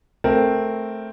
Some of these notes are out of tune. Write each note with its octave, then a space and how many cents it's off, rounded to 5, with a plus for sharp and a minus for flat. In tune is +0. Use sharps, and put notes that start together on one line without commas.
A3 -5 C4 +0 A#4 +0